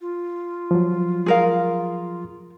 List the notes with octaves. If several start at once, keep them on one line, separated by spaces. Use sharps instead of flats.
F4
F3 F#3
G#4 A#4 F5